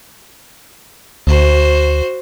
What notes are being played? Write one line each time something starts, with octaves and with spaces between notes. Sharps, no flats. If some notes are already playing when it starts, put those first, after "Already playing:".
D2 F#4 C5